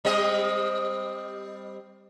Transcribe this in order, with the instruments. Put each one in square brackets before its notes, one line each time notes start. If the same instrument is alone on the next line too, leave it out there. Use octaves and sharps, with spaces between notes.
[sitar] G3 C4 D#5